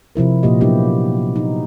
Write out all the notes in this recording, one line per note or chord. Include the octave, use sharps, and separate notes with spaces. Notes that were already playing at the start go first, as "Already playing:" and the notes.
C3 F3 E4 A#4
A#2 A#3 F4 G4 D#5
F#3 B3 D4 E4 G4 D#5
D#4